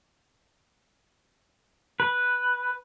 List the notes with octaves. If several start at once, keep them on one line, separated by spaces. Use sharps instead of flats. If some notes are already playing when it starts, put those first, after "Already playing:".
B4